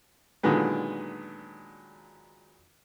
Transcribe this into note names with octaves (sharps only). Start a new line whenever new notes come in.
A#2 D3 D#3 F#3 G#3 B3